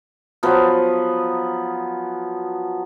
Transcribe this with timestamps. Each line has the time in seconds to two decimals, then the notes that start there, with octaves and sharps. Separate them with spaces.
0.43 F3 F#3 B3